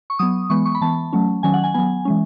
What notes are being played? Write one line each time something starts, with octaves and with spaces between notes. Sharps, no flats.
C#6
F#3 B3 D#6
E3 G#3 B3 C#6
C#6
B5
E3 B3 A5
F#3 A3 C#4
D#3 F#3 C#4 G#5
F#5
G#5
F#3 B3 G#5
E3 G#3 C#4